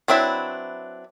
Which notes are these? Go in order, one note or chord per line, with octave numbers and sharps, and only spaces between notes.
F#3 C4 D4 E4 B4